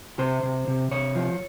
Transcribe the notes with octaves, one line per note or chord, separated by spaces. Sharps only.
C3 C5
C3
C3
C3 C#5
F3